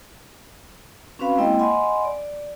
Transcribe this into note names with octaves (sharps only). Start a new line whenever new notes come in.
C4 C#4 F#4 B4 F5 B5
G#3 A#3 C4 E4 D#5 G5
D#5 F#5 G#5 B5 C6
D5